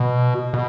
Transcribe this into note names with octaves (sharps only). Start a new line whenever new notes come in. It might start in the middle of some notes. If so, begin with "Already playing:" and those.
Already playing: B2
B2